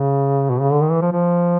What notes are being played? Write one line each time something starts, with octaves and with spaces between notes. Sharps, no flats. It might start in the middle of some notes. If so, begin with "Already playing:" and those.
Already playing: C#3
B2
C#3
D3
D#3
E3
F3
F3